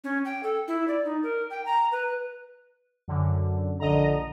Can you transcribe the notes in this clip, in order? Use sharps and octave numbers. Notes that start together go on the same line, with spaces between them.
C#4
G5
A4
E4
D5
D#4
A#4
G5
A#5
B4
F#2 D3
A#1 D3 D#5 A#5